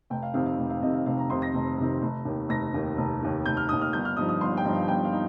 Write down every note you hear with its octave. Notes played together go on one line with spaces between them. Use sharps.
F1 G5
F5
F2 C3 D#3 C4 F5
F5
F1
F5
F2 C3 D#3 C4 D#5
F5
F1 F5
A#5
F2 C3 D#3 C4 C6
A#6
F1
F2 C3 D#3 C4
F1
D#2 D#3
F1 A#6
D#2 D#3
F1
D#2 D#3
F1 G6
F6
D#2 D#3 D#6
F6
G1 G6
F6
G2 F3 D#4 D#6
D#6
G1 C6
G5
G2 F3 D#4
F5
G1 G5
F5
D#4